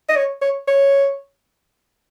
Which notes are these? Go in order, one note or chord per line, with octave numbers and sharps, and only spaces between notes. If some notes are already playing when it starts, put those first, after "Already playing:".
D#5
C#5
C#5
C#5